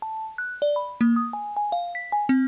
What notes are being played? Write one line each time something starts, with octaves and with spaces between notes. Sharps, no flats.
A5
F#6
D5
B5
A#3
D#6
G#5
G#5
F5
B6
G#5
C4